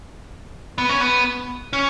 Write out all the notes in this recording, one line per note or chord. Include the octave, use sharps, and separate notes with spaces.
B3
C#4
B3
C#4